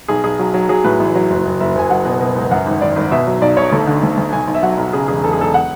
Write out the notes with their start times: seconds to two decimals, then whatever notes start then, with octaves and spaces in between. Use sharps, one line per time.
0.08 B1 G#4
0.24 B1 G#4
0.39 F#3
0.54 F#3
0.69 F#3 G#4
0.84 A2 B4
1.00 A1
1.15 F#3
1.30 F#1
1.45 F#1
1.60 F#1 E5
1.75 F#1 G#5
1.90 F#3 F#5
2.05 B2
2.21 B2
2.36 C#2
2.51 F#2 F#5
2.66 G#1
2.81 G#1 D5
2.96 G#1
3.11 B2 E5
3.27 F#3
3.42 B1 D5
3.57 B1 C#5
3.72 D2 A4
3.87 D3
4.03 D2
4.17 D2
4.32 B1 G#5
4.48 B1
4.55 E5
4.63 F#3 F#5
4.78 B1
4.93 C#3 G#4
5.08 E1 G#4
5.24 E1 A4
5.33 G#4
5.38 E1 A4
5.54 F#5